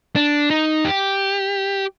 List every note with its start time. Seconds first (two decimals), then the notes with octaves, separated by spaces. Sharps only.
0.16 D4
0.50 D#4
0.85 G4